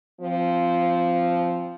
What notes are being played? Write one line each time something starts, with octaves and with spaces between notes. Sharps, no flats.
F3 C4